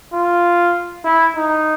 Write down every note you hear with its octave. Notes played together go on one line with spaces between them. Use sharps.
F4
E4
D#4